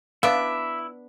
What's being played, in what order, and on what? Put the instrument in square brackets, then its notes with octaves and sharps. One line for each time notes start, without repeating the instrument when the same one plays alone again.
[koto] B3 D4 [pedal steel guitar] E4 D6 [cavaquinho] E5 [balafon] F5